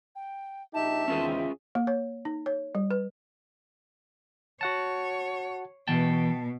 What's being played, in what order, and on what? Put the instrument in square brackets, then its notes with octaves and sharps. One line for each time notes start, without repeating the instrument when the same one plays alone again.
[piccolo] G5
[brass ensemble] A#1 D#4 G4 [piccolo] E5 [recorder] A5
[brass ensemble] E2 D#3 C4 [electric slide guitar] C#4 F4 G#4
[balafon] A#3
C#5
D#4
C#5
G3
B4
[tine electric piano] F#4 F#5 A5 [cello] C#5
[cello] B2 [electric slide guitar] E3 G5 [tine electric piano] A5